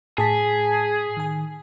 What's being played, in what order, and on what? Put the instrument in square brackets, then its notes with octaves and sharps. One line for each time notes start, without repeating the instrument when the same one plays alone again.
[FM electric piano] A2 A5 B6 [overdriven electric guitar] G#4
[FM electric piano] D#3 G#5